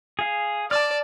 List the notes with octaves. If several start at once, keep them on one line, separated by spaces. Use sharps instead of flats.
G#4 F5
D5 A5 D6 F6